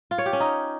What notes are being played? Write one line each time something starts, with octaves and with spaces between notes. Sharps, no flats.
F4
C#5
G4
C#4
D#4